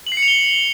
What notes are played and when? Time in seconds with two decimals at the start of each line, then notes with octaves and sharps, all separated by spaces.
0.07 F#7
0.12 C7
0.17 C#7
0.23 F7
0.28 G7